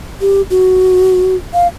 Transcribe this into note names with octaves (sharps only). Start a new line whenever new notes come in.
G4
F#4
F5